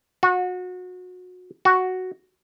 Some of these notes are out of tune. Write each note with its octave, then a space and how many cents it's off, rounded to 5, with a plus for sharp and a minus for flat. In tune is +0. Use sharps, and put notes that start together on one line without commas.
F#4 -30
F#4 +0